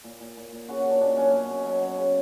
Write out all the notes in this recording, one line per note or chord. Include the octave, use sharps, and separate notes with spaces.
A#2
A#2
A#2
A#2
C#3 F#4
C#3 F#4
D4
A#2 D4
F#3 C#4
B2
B2
F#3
F#3
C#3